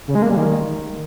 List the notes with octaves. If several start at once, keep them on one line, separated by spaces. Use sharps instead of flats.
C#3
G#3
A#3
G3
D#3